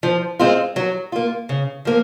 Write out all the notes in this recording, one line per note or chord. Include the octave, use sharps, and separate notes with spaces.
F3
G#3 C4 F4
F#3
A#3 F4
C#3
F3 A#3